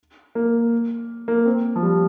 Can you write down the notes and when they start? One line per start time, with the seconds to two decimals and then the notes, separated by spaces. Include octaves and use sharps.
0.35 A#3
1.28 A#3
1.46 C4
1.76 F3
1.83 G3